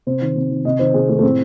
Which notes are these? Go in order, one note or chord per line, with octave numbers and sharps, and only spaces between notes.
C3 C5
D#3
C3
D#3
C3 D#5
D#3 C5
C3 G#4
D#3 A3
A3
A2 C4